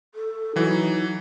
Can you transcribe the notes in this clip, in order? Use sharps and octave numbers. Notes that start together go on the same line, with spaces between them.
A4
E3 F#3 D#4